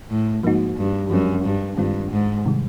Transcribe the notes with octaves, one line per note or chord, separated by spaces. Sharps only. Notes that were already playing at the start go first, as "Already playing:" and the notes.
A2
G#2 F3 A#3 D#4 F#4
G2
F#2 F3 G#3 C4
G2
G2 D#3 G#3 C4 F4
G#2
C3 D#3 G3